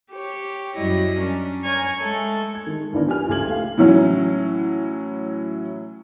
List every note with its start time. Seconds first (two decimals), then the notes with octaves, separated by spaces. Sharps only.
0.11 G4 C#5
0.76 F#2 F#3 G3 E4 D#5 A#6
1.17 C#4 D4 A#4
1.65 C#5 G#5 A#5 C#6 F6 G#6
2.00 G#3 A3 A4
2.55 G#6
2.67 D#3 G#3
2.93 D2 A2 D#3 B3 D4 A#4
3.07 F3 G4 G#5 F6
3.28 F#1 C#2 A3 G4 G#6 F#7
3.49 A3 F5
3.78 A2 E3 F#3 C#4